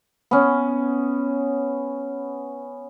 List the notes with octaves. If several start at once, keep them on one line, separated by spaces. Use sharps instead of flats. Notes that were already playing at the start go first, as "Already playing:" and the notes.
B3 C#4